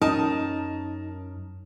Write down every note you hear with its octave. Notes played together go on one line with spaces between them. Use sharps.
F#2 F#3 C#4 D#4 A#4 A5 D#6